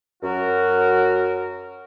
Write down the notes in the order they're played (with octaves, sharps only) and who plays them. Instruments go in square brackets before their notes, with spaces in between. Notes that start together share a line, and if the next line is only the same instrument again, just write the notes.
[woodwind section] F#2 F#4 A#4